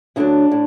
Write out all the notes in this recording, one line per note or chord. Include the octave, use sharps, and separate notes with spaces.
D2 D3 F#3 D4
A2